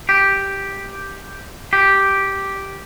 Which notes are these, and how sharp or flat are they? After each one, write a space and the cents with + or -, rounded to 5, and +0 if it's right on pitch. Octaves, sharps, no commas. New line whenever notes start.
G4 +0
G4 -5